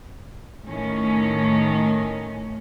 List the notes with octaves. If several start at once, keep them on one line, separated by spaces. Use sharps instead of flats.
A2 D#3 A3 C#4